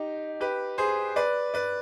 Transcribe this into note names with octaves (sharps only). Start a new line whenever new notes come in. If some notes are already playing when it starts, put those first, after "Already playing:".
Already playing: D#4 G4
G4 B4
G#4 C5
B4 D5
B4 D5